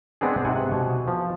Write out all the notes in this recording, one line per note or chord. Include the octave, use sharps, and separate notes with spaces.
G#3 B3 C4 D4 G#4
G#2 C3 F#5 G#5
B2
F3